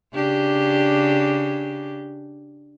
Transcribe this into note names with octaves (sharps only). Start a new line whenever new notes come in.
C#3 D4 G4